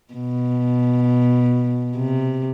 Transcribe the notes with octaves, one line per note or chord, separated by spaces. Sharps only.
B2
C3